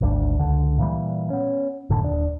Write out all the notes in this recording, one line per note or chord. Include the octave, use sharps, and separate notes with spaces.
G#1 D2 E3 D4
C#2 D3
A#2 E3 G3
B3 C#4
F#1 A2 D3
D#1 D4